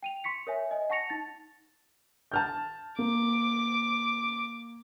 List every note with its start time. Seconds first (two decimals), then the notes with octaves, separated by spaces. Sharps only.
0.03 G5 D#7 F7
0.24 C6 C#6 B6 C#7
0.47 A#4 C#5 E5 G#5
0.71 D#5 G#5
0.90 F#5 A5 C#6 A#6 C#7 F7
1.10 D#4 A6
2.32 A5 F6 G6
2.99 A#3 D6